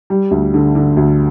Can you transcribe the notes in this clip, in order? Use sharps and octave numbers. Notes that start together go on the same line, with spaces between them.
G3
D2
D3
D3
D2